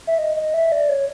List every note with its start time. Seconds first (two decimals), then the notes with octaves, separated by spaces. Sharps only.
0.07 E5
0.18 D#5
0.36 D#5
0.54 E5
0.72 D5
0.89 C#5